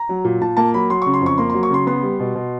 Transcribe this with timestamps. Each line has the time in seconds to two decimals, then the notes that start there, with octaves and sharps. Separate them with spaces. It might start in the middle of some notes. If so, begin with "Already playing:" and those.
Already playing: A#5
0.09 F#3
0.25 A#2
0.41 A#2 A5
0.57 A#3 A5
0.74 F#3 B5
0.90 F#3 C6
1.02 C#6
1.06 C#3
1.14 C6
1.21 F2 C#6
1.38 A#3 C6
1.50 C6
1.54 F#3
1.63 C#6
1.70 C#3 C6
1.87 B3 C6
2.02 G3
2.20 B2
2.35 B2